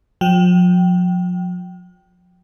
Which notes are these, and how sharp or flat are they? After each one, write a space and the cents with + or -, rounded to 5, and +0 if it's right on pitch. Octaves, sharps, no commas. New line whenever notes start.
F3 +45 G5 -15